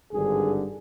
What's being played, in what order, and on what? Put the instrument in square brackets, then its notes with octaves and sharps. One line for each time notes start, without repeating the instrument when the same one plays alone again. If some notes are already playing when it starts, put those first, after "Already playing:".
[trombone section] G#1 G2 D3 G#4